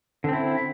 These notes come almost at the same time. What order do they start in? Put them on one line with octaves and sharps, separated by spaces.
D3 C4 E4